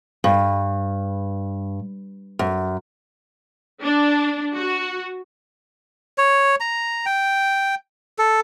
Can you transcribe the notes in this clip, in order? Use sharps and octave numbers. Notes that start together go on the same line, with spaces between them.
G2
F#2
D4
F#4
C#5
A#5
G5
A4